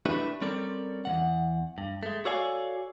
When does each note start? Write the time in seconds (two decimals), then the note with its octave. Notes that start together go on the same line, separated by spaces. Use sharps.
0.06 A3 D4 E4 G4 B4
0.41 G3 C4 C#4 A4 A#4 D5
1.05 E2 E3 F#5
1.78 G2
2.03 G#3 A3
2.25 F#4 A4 C#5 D5 F5 G#5